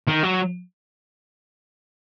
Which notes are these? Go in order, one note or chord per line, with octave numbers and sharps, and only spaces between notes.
D#3
F#3